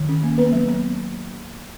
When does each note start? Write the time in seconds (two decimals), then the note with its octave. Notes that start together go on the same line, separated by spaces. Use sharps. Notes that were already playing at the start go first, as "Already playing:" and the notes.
Already playing: D#3
0.09 C#4
0.23 A#3
0.38 B3 B4
0.52 F#3
0.68 B3